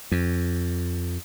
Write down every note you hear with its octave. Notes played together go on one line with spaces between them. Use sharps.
F2